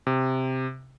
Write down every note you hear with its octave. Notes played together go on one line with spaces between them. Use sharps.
C3